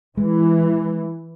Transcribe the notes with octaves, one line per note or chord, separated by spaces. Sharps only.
E3 G#3